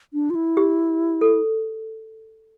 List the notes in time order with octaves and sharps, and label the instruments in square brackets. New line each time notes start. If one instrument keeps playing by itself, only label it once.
[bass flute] D4
F4
E4
[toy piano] G4
A4